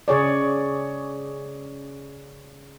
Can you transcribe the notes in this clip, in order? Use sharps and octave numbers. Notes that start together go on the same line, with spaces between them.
C#3 G#4 C#5 D5